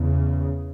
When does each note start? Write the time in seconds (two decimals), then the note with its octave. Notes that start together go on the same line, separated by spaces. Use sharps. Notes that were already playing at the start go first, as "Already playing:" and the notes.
Already playing: E2 C#3